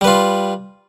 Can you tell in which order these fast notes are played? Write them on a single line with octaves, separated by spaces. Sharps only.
G3 B4 F4